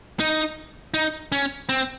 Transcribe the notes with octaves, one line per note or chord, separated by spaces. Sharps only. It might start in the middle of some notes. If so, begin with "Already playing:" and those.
D#4
D#4
C#4
C4